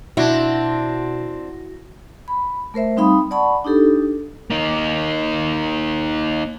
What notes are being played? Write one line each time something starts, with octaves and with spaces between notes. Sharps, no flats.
B2 C4 D4 E4 F#4 A#6
B5
A3 A#4 C5 E5
G3 C4 D#4 F5 B5 D#6
D5 F#5 A5 B5 C#6
D4 D#4 G4 A4
A#3 D#4